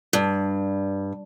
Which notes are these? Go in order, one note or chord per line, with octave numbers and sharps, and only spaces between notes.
G2